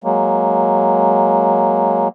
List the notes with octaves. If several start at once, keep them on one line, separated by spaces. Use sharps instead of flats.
F#3 G#3 A#3